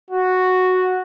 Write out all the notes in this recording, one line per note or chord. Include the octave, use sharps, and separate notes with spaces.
F#4